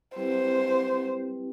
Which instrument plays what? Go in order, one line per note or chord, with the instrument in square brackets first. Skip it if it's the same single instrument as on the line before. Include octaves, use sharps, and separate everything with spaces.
[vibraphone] G3 C4 E4 G4 B4 [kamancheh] C5